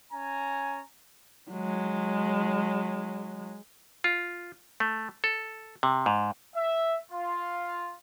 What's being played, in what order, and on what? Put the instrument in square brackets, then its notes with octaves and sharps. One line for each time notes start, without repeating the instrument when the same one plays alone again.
[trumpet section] C#4 G#5 A#5
[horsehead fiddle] F#3 G#3
[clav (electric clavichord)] F4
A3
A4
C3
G#2
[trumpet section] E5
F4